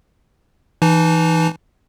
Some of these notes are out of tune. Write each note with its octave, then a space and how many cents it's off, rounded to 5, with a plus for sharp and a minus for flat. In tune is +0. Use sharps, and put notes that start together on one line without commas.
E3 +0 D#4 +0 A5 -30